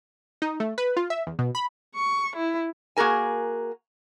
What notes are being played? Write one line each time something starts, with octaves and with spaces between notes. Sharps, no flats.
D#4
A3
B4
F4
E5
E2
B2
B5
C#6
E4
A#3 F#4 G#4 A#4 G#5